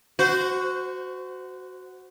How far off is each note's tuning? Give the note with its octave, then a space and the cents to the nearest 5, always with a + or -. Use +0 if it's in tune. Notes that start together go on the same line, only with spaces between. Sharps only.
F#4 +0 C5 -30